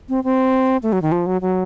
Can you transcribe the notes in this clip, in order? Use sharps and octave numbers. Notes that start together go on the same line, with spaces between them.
C4
C4
A3
F#3
D#3
F3
F#3
F#3